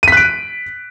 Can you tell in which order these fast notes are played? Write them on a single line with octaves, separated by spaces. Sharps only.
D#7 B6 F#6 D7